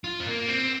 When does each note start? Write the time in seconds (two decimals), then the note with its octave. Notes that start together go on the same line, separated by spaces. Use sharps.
0.04 F4
0.20 C4
0.26 A#3
0.49 C4